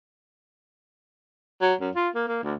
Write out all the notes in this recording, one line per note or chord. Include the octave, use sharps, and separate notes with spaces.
F#3
F#2
F4
A#3
A#3
D2